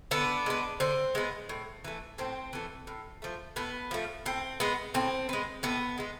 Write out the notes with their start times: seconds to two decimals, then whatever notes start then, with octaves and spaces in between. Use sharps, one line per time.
0.11 D3 B3 D4
0.46 G#3 B3
0.80 D3 C4
1.15 G#3 B3
1.49 A2
1.85 E3 A3
2.18 A2 C4
2.53 E3 A3
2.87 A2
3.22 F3 A3
3.56 A2 B3
3.91 F3 A3
4.26 A2 C4
4.60 G#3 B3
4.94 A2 C4
5.29 G#3 B3
5.63 A2 B3
5.98 G#3 B3